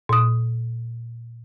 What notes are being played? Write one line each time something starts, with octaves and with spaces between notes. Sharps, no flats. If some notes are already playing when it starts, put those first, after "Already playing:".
A#2 D#6